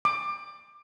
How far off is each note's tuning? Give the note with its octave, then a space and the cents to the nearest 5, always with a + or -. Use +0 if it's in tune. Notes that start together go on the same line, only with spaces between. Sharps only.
D6 +25